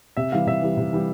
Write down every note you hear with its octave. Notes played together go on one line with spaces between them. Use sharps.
C3 E5
E3 G3 F5
C3 E5
E3 G3
C3
E3 G3